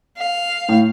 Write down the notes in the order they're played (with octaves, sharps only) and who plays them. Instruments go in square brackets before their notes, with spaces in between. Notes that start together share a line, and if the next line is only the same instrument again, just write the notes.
[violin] F5
[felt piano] A2